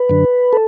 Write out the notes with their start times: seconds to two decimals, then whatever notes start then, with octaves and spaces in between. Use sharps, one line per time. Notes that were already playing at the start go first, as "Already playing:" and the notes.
Already playing: B4
0.09 F#2 D3
0.53 A4